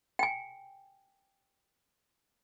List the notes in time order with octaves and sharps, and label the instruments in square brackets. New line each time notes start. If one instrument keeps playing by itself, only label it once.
[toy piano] G5 G#5